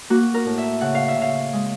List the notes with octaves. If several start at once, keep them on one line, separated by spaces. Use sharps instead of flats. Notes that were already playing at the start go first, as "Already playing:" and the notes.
A#3 F#4
A#4
A2
E5
C#3 F#5
F5
E5
C#3 F5
G#3